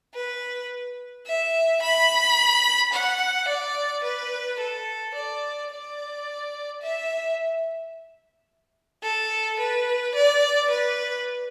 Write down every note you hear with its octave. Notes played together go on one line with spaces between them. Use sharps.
B4
E5
B5
F#5
D5
B4
A4
D5
D5
E5
A4
B4
D5
B4